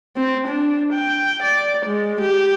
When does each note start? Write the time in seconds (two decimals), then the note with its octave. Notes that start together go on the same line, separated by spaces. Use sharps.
0.17 C4
0.48 D4
0.93 G5
1.43 D5
1.86 G#3
2.22 G4